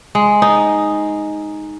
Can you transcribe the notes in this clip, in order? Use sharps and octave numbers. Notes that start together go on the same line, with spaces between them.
G#3
D#4